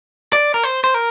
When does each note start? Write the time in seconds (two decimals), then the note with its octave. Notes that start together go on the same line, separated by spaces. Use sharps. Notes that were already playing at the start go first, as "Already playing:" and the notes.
0.33 D5
0.54 A#4
0.64 C5
0.84 C5
0.94 A#4